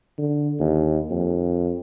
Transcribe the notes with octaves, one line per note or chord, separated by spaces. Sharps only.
D3
D#2
F2